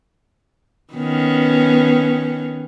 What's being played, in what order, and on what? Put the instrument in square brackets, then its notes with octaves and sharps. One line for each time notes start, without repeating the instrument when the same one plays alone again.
[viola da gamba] D#3 B3 C#4